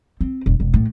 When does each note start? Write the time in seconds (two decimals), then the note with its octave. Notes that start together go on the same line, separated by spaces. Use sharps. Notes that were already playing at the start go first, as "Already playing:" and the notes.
0.21 C4
0.46 D#1
0.60 E1
0.74 A2